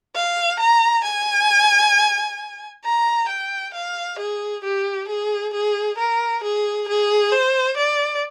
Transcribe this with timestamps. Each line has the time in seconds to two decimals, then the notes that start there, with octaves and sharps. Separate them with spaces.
0.15 F5
0.60 A#5
1.04 G#5
2.84 A#5
3.29 G5
3.74 F5
4.19 G#4
4.64 G4
5.08 G#4
5.53 G#4
5.98 A#4
6.43 G#4
6.88 G#4
7.32 C5
7.77 D5